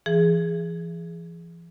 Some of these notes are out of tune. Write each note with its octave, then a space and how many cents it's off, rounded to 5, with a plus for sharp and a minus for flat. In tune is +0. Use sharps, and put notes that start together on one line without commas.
E3 +40 G#4 +0